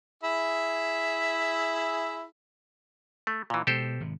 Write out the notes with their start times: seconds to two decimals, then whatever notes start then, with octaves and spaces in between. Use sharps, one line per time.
0.23 E4 G#4 E5
3.27 A3
3.50 A#2 E3
3.67 B2 G#3 G4 A4 C5
4.00 G#1 C3